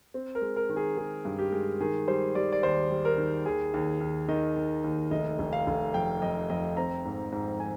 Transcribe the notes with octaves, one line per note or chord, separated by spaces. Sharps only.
C4
A#4
G#3
A#4
D#3
G#4
D#3 G#4
G2
G4
G#3
D#3 G#4
G3 C5
G3 D5
D5
D#2 C5
G3
A#4
D#3
D#2 G#4
D#2
D#2
D#3 D#5
D#3
D#2
F1 D#5
F1
F5
F1
F2 G5
F2 D#5
F2 D#5
C4 A#5
G#2
G#2
G#5